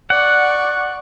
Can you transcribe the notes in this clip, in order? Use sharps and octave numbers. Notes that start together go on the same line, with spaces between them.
D5 F#5 C#6